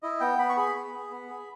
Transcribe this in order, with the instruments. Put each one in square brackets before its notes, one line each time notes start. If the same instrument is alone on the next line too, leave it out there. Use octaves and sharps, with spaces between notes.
[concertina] E4 D#5
B3 G5
B3 B5
C#6
G#4 B5
B3
G#4
B3
G#4